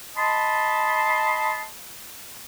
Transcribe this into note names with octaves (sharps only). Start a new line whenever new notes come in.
D#5 A5 B5 C6